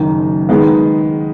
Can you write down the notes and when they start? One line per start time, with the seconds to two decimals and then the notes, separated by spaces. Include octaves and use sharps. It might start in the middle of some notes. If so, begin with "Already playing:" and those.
Already playing: F#1 F#2 D#3
0.49 D#3 G#3 B3